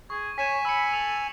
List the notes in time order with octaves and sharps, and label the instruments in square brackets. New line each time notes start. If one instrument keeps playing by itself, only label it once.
[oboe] G#4 [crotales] C#6
[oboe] C#5 [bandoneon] G#5 [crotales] B6 E7
[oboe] B5 [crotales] E6 C#7
[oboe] A4 [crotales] E6 F7 F#7